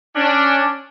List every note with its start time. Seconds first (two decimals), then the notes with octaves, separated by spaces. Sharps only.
0.16 C#4 D4